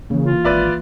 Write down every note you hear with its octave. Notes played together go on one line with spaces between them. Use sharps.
C#3 E3 A#3
F4
G#1 B4 D5 E5